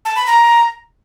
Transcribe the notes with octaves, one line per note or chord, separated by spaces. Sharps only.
A5
B5
A#5